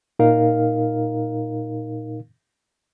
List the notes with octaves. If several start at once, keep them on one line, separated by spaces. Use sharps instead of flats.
A#2 D#4 A#4 F5